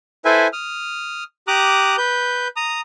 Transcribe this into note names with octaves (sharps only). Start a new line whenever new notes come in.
E4 A4 B4 C5 E5 G#5
D#6 F6
G4 A#5 D6 D#6 F#6
B4 G6
A#5 D#6